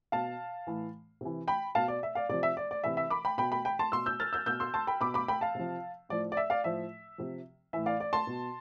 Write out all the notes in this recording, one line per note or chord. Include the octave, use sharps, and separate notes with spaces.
B2 F5 A5
A2 E3
C3 E3
G5 B5
B2 F5 A5
D5
E5
D5 F5
C3 F3 D5
E5
D5
D5
C3 E3 E5
E5
B5 D6
G5 B5
B2 G5 B5
G5 B5
G5 B5
A5 C6
B2 C6 E6
E6 G6
F6 A6
E6 G6
B2 E6 G6
C6 E6
A5 C6
G5 B5
B2 B5 D6
B5 D6
G5 B5
F5 A5
C3 F3
A2 F3 D5
D5
E5
D5 F5
A2 F3 E5
C3 F3
A2 E3 E5
D5 F5
D5
A5 C6
B2